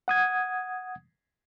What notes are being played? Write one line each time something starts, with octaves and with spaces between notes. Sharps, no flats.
F#5 D#6 G#6